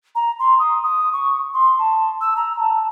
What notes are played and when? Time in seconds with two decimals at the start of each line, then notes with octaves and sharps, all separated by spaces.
0.15 A#5
0.40 C6
0.59 D#6
0.83 D#6
1.13 C#6
1.54 C6
1.79 A5
2.21 E6
2.36 A#5
2.59 A5